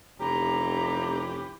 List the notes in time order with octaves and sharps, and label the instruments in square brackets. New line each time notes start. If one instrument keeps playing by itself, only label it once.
[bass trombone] F1 [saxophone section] E3 C#4 G4 [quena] A#5